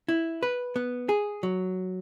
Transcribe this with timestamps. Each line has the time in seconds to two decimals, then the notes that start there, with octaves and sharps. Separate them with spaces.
0.08 E4
0.43 B4
0.76 B3
1.09 G#4
1.43 F#3